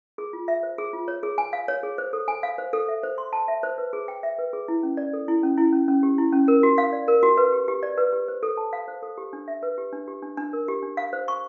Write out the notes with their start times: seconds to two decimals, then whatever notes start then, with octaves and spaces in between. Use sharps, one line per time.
0.18 G#4
0.33 F4
0.48 E5
0.63 C5
0.78 G#4
0.93 F4
1.08 C#5
1.23 G#4
1.38 G#5
1.53 F5
1.68 C#5
1.83 G#4
1.98 C5
2.13 A4
2.28 G#5
2.43 F5
2.58 C5
2.73 A4
2.89 E5
3.03 C5
3.18 C6
3.33 A5
3.48 E5
3.63 C5
3.78 B4
3.93 G#4
4.08 G5
4.23 E5
4.38 B4
4.53 G#4
4.68 E4
4.83 C#4
4.97 D5
5.13 A4
5.28 E4
5.43 C#4
5.58 E4
5.73 C#4
5.88 C#4
6.03 G4
6.18 E4
6.33 C#4
6.48 A#4
6.63 F#4
6.78 F5
6.93 D5
7.08 A#4
7.23 F#4
7.37 B4
7.52 G4
7.68 G4
7.83 D5
7.98 B4
8.13 G4
8.28 C5
8.43 A4
8.57 A5
8.73 F5
8.88 C5
9.02 A4
9.18 G4
9.33 D4
9.48 E5
9.63 B4
9.78 G4
9.93 D4
10.08 G4
10.23 D4
10.37 D4
10.53 A#4
10.68 G4
10.83 D4
10.97 F5
11.13 C5
11.28 C#6